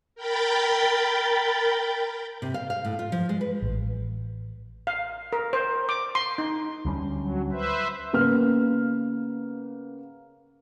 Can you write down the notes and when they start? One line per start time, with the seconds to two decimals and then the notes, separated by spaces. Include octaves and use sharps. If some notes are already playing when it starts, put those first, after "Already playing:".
0.15 A#4 G5 B5 G6 A6
2.42 C3
2.54 F5
2.70 F5
2.85 A2
2.99 F4
3.12 F3
3.29 G#3
3.41 B4
3.62 A1
4.87 F5
5.33 A#4
5.53 C5
5.89 D6
6.15 C6
6.38 D#4
6.85 D2 G3 C#4
7.16 F#3
7.52 B4 C5 E5
8.13 C#3 A#3 B3 F6